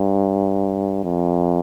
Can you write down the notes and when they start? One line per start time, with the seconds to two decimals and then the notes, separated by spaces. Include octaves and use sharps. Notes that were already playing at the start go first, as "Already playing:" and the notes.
Already playing: G2
1.04 F2